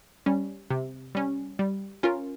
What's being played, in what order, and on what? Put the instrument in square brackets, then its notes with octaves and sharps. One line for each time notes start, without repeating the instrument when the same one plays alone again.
[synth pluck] G3 C#4
C3
G3 C#4
G3
C#4 F4 A#4